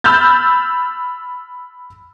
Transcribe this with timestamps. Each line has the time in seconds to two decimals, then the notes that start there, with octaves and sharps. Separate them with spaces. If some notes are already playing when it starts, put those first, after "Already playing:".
0.04 B5 E6 F6 G6 A6